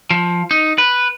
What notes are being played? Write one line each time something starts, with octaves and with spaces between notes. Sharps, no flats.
F3
D#4
B4